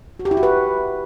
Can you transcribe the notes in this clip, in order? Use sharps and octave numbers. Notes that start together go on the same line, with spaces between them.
F#4
G4
E4
F#4
B4